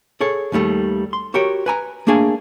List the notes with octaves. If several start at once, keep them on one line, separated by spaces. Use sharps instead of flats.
G#4 A4 C#5
D#2 D#3 G3 A3
C6
F#4 G4 A#4 C#5 G5
B4 G#5 A#5
A3 A#3 D4 G#4 F5 G#5